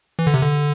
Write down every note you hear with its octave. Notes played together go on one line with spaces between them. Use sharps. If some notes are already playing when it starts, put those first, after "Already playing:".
E3
D3
C3
D3